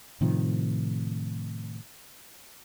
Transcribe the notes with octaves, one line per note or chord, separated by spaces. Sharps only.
A2 C3 D#3 F3